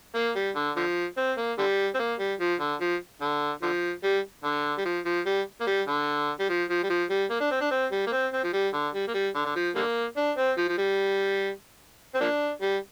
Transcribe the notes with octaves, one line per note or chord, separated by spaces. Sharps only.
A#3
G3
D3
D3 F3
C4
A#3
D3 G3
C4
A#3
G3
F3
D3
F3
D3
D3 F3
G3
D3
G3
F3
F3
G3
A#3
G3
D3
G3
F3
F3
G3
F3
G3
A#3
D4
C4
D4
C4
G3
A#3
C4
C4
F3
G3
D3
G3
A#3
G3
D3
D3
F3
D3 G3 A#3
D4
C4
F3
F3
G3
C4
F3 A#3 D4
G3